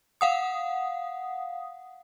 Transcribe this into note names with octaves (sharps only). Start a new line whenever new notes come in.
F5 F#5 D#6